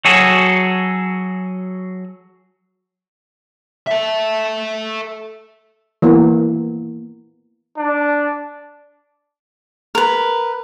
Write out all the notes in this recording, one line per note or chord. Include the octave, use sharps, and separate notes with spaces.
F#3 F#4 G#4 A4
A4 E5
E3 A#3 B3
D4
A#4 B4